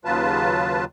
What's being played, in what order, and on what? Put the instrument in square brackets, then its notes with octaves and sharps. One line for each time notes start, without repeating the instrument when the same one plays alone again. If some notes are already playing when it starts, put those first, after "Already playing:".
[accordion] D#2 C#3 F#3 F4 B4 A5